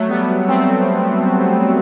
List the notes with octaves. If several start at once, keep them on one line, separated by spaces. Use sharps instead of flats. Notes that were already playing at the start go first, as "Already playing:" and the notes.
Already playing: F#3 A3
G3 B3
A3 C4